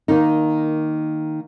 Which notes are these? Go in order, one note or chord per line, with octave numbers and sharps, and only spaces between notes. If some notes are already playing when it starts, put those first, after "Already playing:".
D#3 A#3 D#4